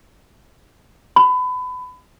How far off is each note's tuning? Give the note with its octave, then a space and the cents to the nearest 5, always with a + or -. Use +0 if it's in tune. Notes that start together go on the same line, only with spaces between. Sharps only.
B5 +30